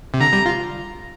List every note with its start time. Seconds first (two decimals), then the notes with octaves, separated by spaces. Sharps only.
0.14 C3
0.20 D3 A#5
0.33 G3
0.46 F4